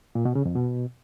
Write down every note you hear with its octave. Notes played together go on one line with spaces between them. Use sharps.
A#2
B2
C#3
F2
B2